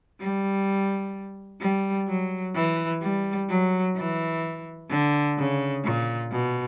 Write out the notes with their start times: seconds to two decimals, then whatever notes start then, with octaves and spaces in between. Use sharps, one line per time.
0.20 G3
1.61 G3
2.08 F#3
2.55 E3
3.02 G3
3.49 F#3
3.96 E3
4.90 D3
5.38 C#3
5.84 A#2
6.32 B2